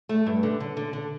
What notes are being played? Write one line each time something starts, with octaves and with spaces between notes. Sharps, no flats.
A3
G2
D3
D3
D3
D3